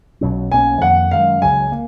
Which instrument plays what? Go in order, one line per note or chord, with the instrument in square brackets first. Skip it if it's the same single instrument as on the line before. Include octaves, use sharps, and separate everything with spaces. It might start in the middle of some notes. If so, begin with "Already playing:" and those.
[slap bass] B1 B2 F#3 C#4
[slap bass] B1 B2 A#3 C#4 [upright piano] G#5
[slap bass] F2 D#3 A#3 [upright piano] F#5
[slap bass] F#2 D#3 G#3 [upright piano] F5
[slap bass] C#2 C#3 F#3 [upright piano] G#5
[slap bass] A#3